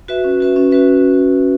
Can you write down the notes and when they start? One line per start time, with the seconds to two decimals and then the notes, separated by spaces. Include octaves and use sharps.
0.08 F#4 B4 E5
0.24 C#4
0.40 F#4 B4 E5
0.56 C#4
0.71 F#4 B4 E5